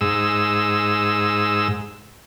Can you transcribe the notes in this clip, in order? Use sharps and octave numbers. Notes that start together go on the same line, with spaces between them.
G#2 E6